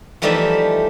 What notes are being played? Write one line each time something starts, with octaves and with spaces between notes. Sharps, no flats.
E3 F3 G3 A3 D#4 E5